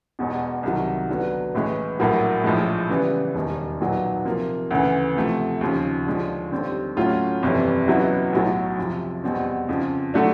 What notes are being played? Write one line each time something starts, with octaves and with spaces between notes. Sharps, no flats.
E1 E2 B2
C2 C3 D#3 F#3
D3 F#3 B3
A1 A2 E3 G#3
A#1 A2 F#3 A#3
A#1 A2 F3 G#3
C#3 E3 G3 B3
E1 D#2 D#3 G3
B1 A#2 F#3 B3 D#4
C3 F3 A#3
D2 C#3 E3
C3 F3 A3
D#2 C#3 F3
D#2 D3 F3 G#3
D#2 D3 G3 C4
A2 F#3 A3 C#4 F4
G1 F2 C3 E3 G3
C#2 B2 F#3 B3 E4
B1 A2 F#3
F2 C3 F3
E2 B2 G3 C4
F2 C#3 F3
D3 F#3 A3 D4